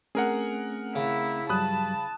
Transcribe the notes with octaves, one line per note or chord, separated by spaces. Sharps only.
A3 C4 C#4 G#4 A#4 F#5
C#3 E4
G2 F#3 G3 A5 B5 D#6 F#6